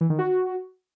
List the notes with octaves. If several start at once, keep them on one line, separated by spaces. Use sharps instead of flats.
E3
D#3
F#4